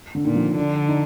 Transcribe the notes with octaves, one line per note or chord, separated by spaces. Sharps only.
D3
A#2 D#3
F3
D3 D4
D#4